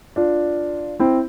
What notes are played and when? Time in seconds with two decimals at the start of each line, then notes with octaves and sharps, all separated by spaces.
0.16 D4 F4
1.00 C4 E4